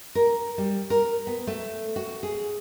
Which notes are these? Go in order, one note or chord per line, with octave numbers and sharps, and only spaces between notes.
A#4
G3
A#4
B3
A3
F#4
G#4